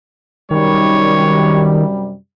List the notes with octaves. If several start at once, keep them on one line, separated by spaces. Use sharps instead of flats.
F#2 C3 D#3 G3 C#5